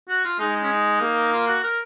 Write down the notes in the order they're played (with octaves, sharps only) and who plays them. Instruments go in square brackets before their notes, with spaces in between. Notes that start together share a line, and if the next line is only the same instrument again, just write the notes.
[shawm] F#4
F4
[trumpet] G#3 [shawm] D#4
[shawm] D#4
C#4
D#4
[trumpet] A#3
[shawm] F4
F#4
A#4